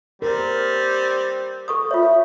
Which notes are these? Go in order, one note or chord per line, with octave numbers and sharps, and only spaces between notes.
G3 C4 A#4
A4 C#6 D#6
F4 C#5 E5